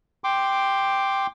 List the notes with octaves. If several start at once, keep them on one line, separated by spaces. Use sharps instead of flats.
G5 C6 D6